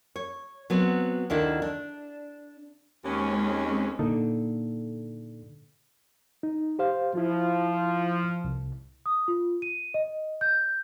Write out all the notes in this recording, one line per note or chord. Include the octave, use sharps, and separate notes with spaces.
C#5
F#3 B3 C4
D2 D#3 D4 E4
D4
D#2 G#3 C4 C#4
A#2 D3 A#3 D#4 A4
D#4
G4 C5 F5
F3 E4 F4
C2
D#6
F4
D#7
D#5
G6